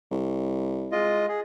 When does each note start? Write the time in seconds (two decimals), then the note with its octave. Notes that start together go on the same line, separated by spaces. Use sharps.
0.11 C2
0.92 G#3 F4 D#5
1.29 G#4